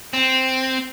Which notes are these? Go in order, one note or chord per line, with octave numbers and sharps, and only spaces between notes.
C4